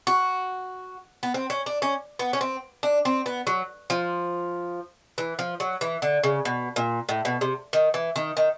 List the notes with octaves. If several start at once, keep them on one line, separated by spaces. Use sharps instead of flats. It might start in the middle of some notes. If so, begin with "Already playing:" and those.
F#4
B3
C4
C#4
D4
C#4
B3
C#4
C4
D4
C4
B3
F#3
F3
E3
F3
F#3
E3
D3
C#3
B2
A#2
A2
B2
C3
D#3
E3
D#3
D#3